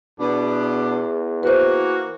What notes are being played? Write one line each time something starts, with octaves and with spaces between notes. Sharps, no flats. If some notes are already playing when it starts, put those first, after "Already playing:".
E2 B2 B3 D4
E3 A#3 F#4 B4 C5